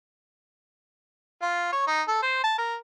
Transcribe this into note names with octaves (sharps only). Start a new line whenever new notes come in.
F4
C#5
D#4
A4
C5
A5
A#4